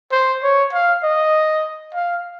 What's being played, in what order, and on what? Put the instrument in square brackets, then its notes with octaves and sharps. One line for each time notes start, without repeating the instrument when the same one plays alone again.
[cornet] C5
C#5
F5
D#5
F5